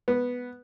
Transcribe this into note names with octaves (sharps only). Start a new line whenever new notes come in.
B3